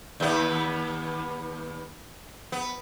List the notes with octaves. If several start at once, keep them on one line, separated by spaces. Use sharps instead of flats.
D#2 B3
B3